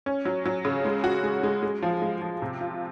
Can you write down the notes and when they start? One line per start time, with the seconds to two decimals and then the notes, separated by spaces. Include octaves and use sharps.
0.06 C#4
0.25 F#3
0.46 F#3
0.65 C#3
0.85 G#3
1.04 F#4
1.23 G#3
1.43 G#3
1.63 G#3
1.83 F3
2.02 G#3
2.22 F3
2.42 C3
2.61 F4